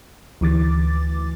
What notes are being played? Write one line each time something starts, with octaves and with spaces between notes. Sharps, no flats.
D2 E3 D6 A6